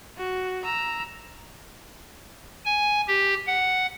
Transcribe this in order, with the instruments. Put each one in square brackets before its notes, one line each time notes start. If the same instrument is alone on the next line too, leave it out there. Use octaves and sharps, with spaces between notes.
[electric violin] F#4
A#5 E6
[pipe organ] G#5
G4
F#5